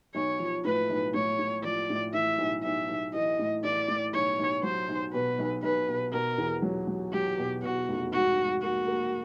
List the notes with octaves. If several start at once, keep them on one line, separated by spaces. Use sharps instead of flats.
B1 C#5
F3
A2 B4
B1
A2 C#5
A2
F3 D5
A2
E3 E5
B1
B1 E5
B1
E3 D#5
A2
E3 D5
A2
B1 C#5
B1
F#3 C5
B1
B2 B4
B1
B1 B4
B2
B2 A#4
E2
F#3
F#3
F#3 G4
B2
B2 F#4
F1
G#2 F#4
G#2
A#3 F#4
A#3